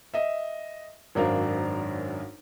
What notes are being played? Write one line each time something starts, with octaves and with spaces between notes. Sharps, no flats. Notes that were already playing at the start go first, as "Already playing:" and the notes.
D#5 E5
G#1 F#2 D4 A#4 C5 F5